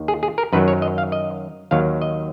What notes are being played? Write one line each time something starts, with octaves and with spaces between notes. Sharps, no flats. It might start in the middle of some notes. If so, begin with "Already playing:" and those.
Already playing: D#2 D#3
G#4
G#4
A#4
F#2 D#3 F#3 B4
C#5
D#5
F5
D#5
D#2 D#3 F#3 F5
D#5